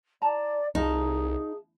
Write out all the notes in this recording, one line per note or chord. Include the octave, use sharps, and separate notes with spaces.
E4 D5 A5 A#5
C2 D#4 F4 G#4 E5 A5